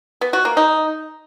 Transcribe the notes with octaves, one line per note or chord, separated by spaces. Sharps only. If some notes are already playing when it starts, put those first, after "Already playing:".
B3
F#4
A#3
D#4